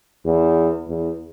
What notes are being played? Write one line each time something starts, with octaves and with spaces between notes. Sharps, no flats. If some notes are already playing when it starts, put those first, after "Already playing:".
E2
E2